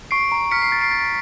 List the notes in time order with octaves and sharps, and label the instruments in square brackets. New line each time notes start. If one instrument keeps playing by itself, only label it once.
[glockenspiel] C#6 [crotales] C7 D7
[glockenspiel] A#5
[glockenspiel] F6 [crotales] B6 C#7
[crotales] C7
[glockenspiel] A6
[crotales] C7 D7
[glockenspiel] A6